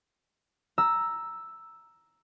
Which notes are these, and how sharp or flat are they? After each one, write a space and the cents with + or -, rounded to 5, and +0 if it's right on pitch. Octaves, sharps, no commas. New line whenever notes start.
A#5 +0 E6 +0